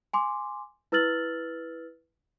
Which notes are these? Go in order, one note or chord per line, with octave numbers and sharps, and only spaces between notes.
G#5 C6 D6
E4 B4 E6 F6 A6 F#7